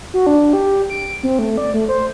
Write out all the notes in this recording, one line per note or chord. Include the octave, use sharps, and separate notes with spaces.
F#4
D4
G4
D7
C4
A3
D5
A3
C5